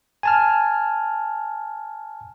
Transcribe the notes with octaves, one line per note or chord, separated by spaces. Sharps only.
G#5 A5 F6